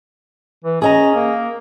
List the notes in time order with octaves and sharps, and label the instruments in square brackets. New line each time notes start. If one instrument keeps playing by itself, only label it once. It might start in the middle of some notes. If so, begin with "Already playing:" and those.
[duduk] E3
[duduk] C#4 [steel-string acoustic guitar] G#4 D#5 A#5
[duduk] A#3